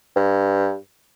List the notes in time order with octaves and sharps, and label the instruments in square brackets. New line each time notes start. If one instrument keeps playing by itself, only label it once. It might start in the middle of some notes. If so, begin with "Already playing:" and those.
[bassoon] G2